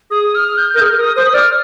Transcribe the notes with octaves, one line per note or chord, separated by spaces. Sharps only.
G#4 D#6
F6
G6
A#4 G6
G#4 F6
A#4 D#6
C5 D#6
D5 F6